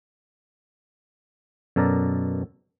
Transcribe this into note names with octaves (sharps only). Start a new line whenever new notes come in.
F#2 B2 A4 A#4 D5